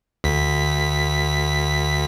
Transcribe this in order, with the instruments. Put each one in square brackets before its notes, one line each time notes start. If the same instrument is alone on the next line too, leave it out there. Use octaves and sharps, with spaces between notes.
[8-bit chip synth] D2 B6